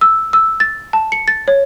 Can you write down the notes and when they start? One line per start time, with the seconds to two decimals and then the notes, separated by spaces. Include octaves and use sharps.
0.01 E6
0.33 E6
0.60 A6
0.93 A5
1.12 C#7
1.28 A6
1.48 C#5